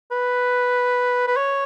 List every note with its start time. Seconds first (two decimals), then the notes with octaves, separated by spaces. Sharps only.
0.11 B4
1.28 B4
1.37 C#5